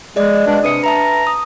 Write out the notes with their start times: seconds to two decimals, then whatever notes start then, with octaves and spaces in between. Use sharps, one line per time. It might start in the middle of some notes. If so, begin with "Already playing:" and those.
0.16 G#3 G#4 D5 D#5
0.46 B2 G#3 D4
0.64 C3 D4 B4 D#6 C#7
0.84 B4 E5 A5 A#5
1.27 D#6